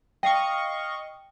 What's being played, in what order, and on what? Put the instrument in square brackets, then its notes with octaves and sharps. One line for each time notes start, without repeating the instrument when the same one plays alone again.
[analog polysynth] D#5 F5 C#6 [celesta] G5